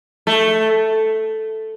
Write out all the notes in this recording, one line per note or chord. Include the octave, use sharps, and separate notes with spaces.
A3